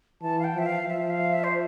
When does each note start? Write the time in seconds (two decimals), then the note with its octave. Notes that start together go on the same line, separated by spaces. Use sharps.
0.22 E3 A5
0.39 F5
0.44 G5
0.55 F3 E5
0.66 F5
0.87 F3 E5
1.10 F5
1.33 E5
1.44 C5